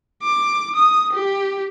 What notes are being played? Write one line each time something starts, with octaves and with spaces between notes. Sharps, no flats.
D6
D#6
G4